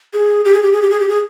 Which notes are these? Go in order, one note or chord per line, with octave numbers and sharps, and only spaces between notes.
G#4
G4
G#4
G4
G#4
G4
G#4
G4
G#4